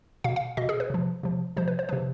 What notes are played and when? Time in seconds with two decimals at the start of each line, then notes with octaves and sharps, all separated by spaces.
0.24 B2 F5
0.36 F5
0.57 B2 D#5
0.69 G#4
0.80 B4
0.90 C3 F3
1.23 C3 F3
1.57 C3 F3 C5
1.68 B4
1.79 C5
1.89 C3 F3 B4